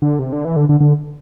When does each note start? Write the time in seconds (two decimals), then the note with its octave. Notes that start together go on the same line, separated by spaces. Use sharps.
0.02 D3
0.19 C3
0.33 D3
0.45 E3
0.56 D3
0.69 D3
0.80 D3